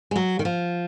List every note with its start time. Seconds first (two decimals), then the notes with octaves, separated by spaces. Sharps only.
0.11 G#3
0.16 F#3
0.39 D#3
0.45 F3